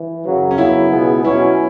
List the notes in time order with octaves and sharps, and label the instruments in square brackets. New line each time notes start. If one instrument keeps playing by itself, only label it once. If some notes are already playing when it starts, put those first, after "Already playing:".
Already playing: [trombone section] E3
F#2 C#3 F#3
[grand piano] C#4
[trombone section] F#2 C#3 F#3 B3 [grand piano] E4
[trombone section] C#2 B2 B3 G#4
[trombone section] B2 F#3 C#4 [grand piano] E4